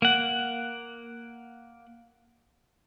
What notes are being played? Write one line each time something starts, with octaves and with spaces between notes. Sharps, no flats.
A#3 F#5